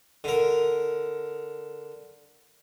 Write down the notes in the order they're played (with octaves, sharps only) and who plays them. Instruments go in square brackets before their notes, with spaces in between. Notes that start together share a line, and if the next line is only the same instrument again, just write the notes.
[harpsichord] D3 A#4